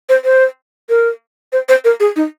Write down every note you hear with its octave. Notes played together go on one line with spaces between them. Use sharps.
C5
C5
A#4
C5
C5
A#4
G#4
D#4